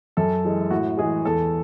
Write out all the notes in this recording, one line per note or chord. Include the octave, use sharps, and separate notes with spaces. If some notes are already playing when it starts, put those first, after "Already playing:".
F#2 A4
E3 G#3
A2 F#4
E3 G#3 G#4
E2 A4